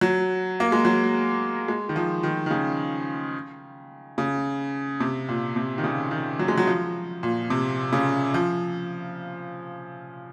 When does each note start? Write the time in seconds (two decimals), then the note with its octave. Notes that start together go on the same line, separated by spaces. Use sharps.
0.01 F#3
0.60 A#3
0.72 G#3
0.85 F#3
1.68 G#3
1.89 D#3
1.96 F3
2.23 D#3
2.46 D#3
2.51 C#3
4.18 C#3
5.00 C3
5.29 A#2
5.56 C3
5.78 D#3
5.84 C#3
6.11 D#3
6.39 F#3
6.48 G#3
6.58 F#3
6.67 F3
7.23 A#2
7.50 C3
7.93 C#3
8.34 F3